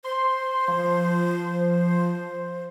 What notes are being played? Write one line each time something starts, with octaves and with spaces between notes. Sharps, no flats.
C5 C6
F3